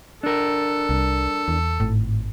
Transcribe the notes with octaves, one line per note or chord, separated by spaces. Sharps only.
D4 A4 A#4
C2 G3
E2
G#1 A2